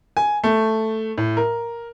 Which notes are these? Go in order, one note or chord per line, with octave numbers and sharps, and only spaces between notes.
G#5
A3
A2
A#4